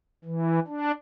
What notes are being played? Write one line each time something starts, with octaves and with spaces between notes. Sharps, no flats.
E3
D4